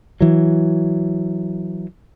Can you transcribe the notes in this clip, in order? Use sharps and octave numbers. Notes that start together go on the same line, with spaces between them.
E3 F#3